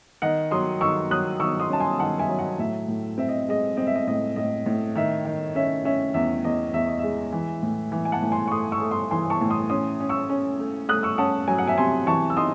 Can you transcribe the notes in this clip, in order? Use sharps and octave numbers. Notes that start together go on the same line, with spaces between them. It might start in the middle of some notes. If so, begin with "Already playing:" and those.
D#3 D#5 F#5
F#3 C6 D#6
D#3 C#6 E6
F#3 D#6 F#6
D#3 C#6 E6
C6 D#6
C#4 A5
G#5 C6
D#3 F#5 A5
E5 G#5
F#3
D#5 F#5
A2 E5
A2
C4 E5
D#5
G#3 D#5
C4 D#5
E5
D#5
A2 D#5
A2 D#5
A2
D#3 E5
D#3
C#4 E5
C#4 E5
E2 E5
E2 D#5
E2 E5
D#5
G#3 E5
E3
A2
E3
G#5
F#5 A5
A2
G#5 C6
C#6
A3 C6 D#6
C#6 E6
A3
C6 D#6
E3 G#5 C6
A5 C#6
A2
C6 D#6
C#4 C6 D#6
C#4
C#6 E6
C#4
A3
A3 D#6 F#6
C#6 E6
C#4 F#5 A5
F#3 G#5
F#5
E5 G#5
C3 G#5 C6
E3 A5 C#6
E6
D#4 C6 D#6